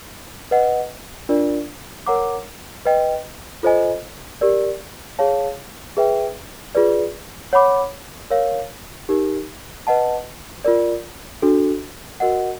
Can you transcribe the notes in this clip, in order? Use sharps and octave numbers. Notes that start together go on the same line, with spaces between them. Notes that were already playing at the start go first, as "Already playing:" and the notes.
B4 D#5 F#5
D4 F4 A#4 D5
A#4 C#5 F#5 A#5 D6
B4 D#5 G5
F4 A4 C5 D#5 G#5
G4 A#4 D5
G#4 C#5 F5 A5
G#4 B4 E5 G5
F4 G#4 B4 D5
C#5 F#5 B5 D6
A#4 C#5 F5
D#4 G4 A#4
B4 D#5 F#5 A5
F4 A#4 D5
D4 F#4 A4
F#4 A#4 D#5 F#5